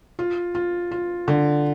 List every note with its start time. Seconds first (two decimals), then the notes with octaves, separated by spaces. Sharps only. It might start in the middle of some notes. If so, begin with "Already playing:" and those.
0.19 F4
0.55 F4
0.91 F4
1.28 D3